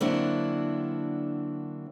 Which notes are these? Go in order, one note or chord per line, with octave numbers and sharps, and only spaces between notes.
D3 F#3 A#3 C4 D4 E4